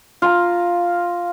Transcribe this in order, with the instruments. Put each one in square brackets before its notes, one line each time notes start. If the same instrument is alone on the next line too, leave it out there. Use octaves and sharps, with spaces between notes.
[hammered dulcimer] F4 A#5